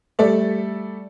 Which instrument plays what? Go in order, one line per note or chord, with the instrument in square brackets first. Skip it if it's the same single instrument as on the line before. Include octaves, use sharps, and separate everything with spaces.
[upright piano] G3 A3 A4 D5 E5